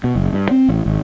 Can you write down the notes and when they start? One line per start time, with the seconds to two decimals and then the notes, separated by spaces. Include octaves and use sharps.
0.04 B2
0.16 F#1
0.33 G2
0.51 C4
0.68 A1
0.86 G#1